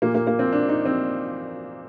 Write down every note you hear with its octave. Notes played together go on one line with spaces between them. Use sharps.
A#2 A#3
A#3
A#3
C4
D4
D#4
C4